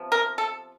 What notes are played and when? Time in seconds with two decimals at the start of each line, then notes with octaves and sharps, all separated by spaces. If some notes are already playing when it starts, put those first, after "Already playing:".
Already playing: C3 F3 B3
0.12 A#4
0.38 A4